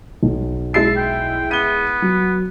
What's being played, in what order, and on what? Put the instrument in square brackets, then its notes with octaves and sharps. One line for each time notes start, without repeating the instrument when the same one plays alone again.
[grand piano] B1
[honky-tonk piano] G#3 E4 C7 [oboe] A5
[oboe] G5
[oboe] B3 [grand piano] D#7 G7
[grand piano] F#3